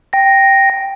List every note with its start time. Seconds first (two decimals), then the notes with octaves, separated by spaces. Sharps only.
0.13 G5 A#6